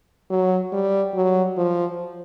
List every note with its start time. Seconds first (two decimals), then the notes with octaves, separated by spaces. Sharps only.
0.30 F#3
0.73 G3
1.14 F#3
1.58 F3